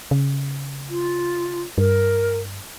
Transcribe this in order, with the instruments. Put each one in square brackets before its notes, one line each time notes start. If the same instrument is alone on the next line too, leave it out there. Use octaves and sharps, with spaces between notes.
[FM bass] C#3
[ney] F4
[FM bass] G2 [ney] A#4